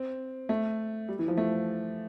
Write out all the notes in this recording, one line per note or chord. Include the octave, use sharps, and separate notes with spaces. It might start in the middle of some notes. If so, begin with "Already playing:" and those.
Already playing: C4
A3
G3
E3
F3
A3